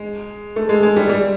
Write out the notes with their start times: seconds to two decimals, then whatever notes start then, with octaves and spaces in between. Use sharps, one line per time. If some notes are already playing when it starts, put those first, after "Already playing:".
Already playing: G#3
0.56 A3
0.69 G#3
0.83 G#3
0.96 G3
1.09 G3